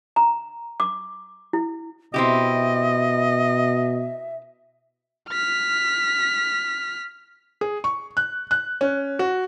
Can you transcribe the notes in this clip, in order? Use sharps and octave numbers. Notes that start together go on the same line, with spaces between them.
A#5
D6
E4
B2 C4 E4 G4 D#5 E5
F6 B6
G#4
C#6
F#6
F#6
C#4
F#4